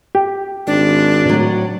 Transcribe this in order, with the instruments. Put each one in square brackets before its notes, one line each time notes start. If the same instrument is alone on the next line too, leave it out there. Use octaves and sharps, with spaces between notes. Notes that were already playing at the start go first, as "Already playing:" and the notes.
[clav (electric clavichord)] G4
[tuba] G#1 [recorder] D4
[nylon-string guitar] A2 F#3